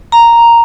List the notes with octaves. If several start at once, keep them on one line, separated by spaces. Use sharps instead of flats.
A#5